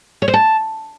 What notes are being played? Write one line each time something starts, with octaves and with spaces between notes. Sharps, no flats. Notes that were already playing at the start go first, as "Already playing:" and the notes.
C#5
C5
A5